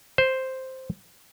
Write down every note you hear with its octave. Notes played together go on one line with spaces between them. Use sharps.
C5